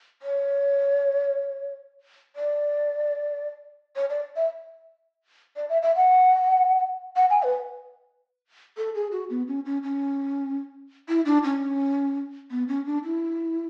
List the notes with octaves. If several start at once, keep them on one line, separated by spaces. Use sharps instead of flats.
C#5
D5
C#5
D5
E5
D5
E5
E5
F#5
F#5
G#5
B4
A4
G#4
F#4
B3
C#4
C#4
C#4
E4
D4
C#4
B3
C#4
D4
E4